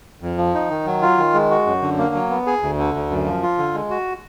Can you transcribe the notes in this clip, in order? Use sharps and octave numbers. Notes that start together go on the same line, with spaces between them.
F2
F3
D#4
D#3
F#3
F4
D#3
G#3
F#4
F#2
D3
A#3
F#3
B3
G#4
D2
D3
D2
F#2
F3
F4
D3
G#3
F#4